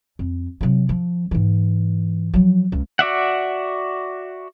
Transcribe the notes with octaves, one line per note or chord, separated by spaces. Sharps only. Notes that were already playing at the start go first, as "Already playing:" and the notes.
F2
C3 F#3
F3
G#2 E3
F3 F#3
C#2
F#4 D5 E5 F#5